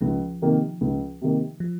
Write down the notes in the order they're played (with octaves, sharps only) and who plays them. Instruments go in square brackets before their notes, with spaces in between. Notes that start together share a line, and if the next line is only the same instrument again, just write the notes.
[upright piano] C#2 [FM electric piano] F3
[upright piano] C3 D#3 A#3
C#2
C3 D#3 A#3
[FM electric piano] F3